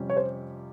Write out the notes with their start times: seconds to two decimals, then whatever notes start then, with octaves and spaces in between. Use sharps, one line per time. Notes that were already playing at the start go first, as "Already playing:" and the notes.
Already playing: F2 C3 G3 C#4 G4
0.10 C#5
0.17 C5